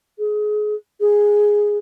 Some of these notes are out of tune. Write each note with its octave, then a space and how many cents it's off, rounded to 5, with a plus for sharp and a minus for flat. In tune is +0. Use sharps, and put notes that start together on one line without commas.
G#4 +25
G#4 -5